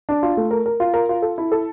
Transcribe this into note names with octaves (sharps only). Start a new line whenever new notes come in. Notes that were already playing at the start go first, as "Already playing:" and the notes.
D4
F4
A3
A#4
A#4
F4
A#4
F4
A4
E4
A4